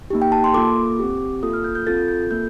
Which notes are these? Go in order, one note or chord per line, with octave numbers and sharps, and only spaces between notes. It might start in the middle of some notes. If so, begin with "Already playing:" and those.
A#3 D#4 G4
G5
A5
C6
A#3 F4 A4 D6
C4 G4
A#3 F4 A4 D#6
F6
G6
G6
C4 F4 A4 A6
G6
A#3 F4 A4 G6